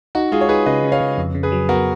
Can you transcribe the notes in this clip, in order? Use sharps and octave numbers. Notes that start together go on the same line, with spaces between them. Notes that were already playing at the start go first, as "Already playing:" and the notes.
D#4 F#4
G#3 F4 G#4
C#5
D#4 G#4 B4
C#3 B4 D#5
C#3
C#5 F5
C#3
F2
C#3
G#4 B4
F#3
B3 F#4 A#4